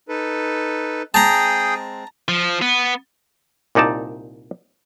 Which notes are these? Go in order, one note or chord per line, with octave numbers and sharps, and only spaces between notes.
D#4 A4 B4
G#3 C4 G#4 G5 A5 A#5 D#6
F3
B3
C2 A#2 D#4 D5 A5